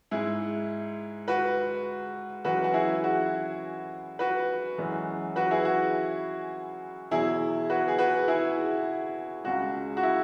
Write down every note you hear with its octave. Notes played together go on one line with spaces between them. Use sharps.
G#2 G#3 E4 G#4
F#4 B4
F#2 E3 G#3 F#4 B4
F#4
E4 G#4
F#4
F#4 B4
F#2 E3 G#3
F#4 B4
E4 G#4
F#4
E2 B2 F#3 E4 G#4
F#4 B4
G#4
F#4 B4
E4 G#4
C#2 C#3 G#3 F#4
F#4
E4